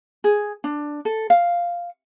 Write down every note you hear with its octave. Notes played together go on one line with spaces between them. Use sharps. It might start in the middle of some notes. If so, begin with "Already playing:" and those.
G#4
D4
A4
F5